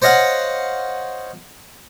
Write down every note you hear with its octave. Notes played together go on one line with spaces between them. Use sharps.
C5 C#5 D#5 F5 F#5